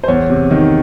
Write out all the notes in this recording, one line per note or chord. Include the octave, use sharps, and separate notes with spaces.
C5
E2 C#5
C3
D#3